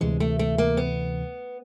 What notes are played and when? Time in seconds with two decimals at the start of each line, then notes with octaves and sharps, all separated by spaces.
0.01 D2 C3 E3 G#3
0.20 A3
0.39 A3
0.58 A#3
0.77 B3